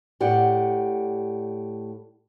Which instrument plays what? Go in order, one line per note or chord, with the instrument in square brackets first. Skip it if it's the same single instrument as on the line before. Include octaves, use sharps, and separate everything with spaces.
[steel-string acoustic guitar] A2 G4 D5 F#5